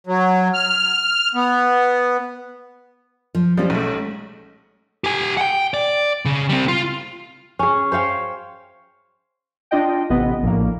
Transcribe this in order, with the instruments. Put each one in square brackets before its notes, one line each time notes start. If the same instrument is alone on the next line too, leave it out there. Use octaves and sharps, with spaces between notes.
[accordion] F#3
F6
B3
[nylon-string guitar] F3
[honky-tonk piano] F3 G3 [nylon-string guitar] G#3 C#4
[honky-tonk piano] B1 A3
[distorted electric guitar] G4 G#5
F#5 G5
D5
C#3
G3 C4
F4
[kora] C#4 G#4
C5 C#5 F5 G5
[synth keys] D4 F4 D#5 G5
A1 C3 B3 D#5
A#1 A2 A#3